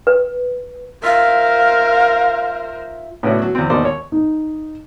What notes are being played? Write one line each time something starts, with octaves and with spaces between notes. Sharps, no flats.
B4
F4 A#4 C5 E5 F5
A2 B3 C#4 D4 E4 F#4
F#3
E2 C4
G#1 D#2 B2 D#4 C5 D5
C#5
D#4